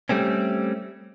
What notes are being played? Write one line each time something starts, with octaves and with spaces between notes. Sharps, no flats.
G3 A3 C4 C#4